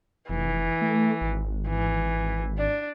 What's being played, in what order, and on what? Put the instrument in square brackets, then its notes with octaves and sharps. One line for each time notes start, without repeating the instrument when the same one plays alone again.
[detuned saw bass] F1 [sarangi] E3
[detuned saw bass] A3
G#1
[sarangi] E3
D4